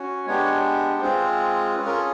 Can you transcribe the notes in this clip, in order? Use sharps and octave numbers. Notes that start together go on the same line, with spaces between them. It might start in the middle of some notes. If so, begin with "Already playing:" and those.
Already playing: C#4 F#4
G#3 B3 D4 G4 C#5
G#3 C4 F4 G#4 C5
C#4 F4 G#4 B4
A#4
A4